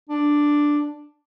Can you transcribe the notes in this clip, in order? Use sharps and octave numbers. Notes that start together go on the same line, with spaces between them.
D4